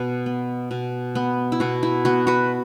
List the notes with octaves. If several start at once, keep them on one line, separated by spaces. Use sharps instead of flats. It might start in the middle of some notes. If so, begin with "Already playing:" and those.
Already playing: B2 B3
B3
B2
B3
E4
B2 F#4
E4
B3 F#4
F#4 B4